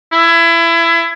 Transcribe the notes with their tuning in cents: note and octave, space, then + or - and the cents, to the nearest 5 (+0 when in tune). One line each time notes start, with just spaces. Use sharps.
E4 +25